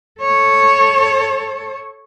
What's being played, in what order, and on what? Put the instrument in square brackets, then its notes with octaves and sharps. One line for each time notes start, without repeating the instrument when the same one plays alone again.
[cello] A4 C#5